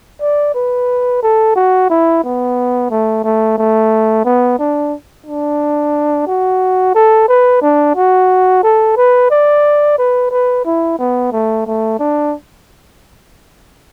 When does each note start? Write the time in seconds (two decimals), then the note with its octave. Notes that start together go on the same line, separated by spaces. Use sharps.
0.21 D5
0.54 B4
1.22 A4
1.55 F#4
1.89 E4
2.24 B3
2.90 A3
3.24 A3
3.58 A3
4.24 B3
4.59 D4
5.26 D4
6.27 F#4
6.94 A4
7.28 B4
7.62 D4
7.96 F#4
8.63 A4
8.97 B4
9.30 D5
9.98 B4
10.31 B4
10.65 E4
10.98 B3
11.32 A3
11.66 A3
11.99 D4